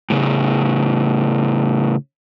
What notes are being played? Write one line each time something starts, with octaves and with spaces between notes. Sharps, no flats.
A2 C#3